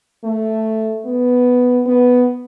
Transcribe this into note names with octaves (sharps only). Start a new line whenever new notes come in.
A3
B3
B3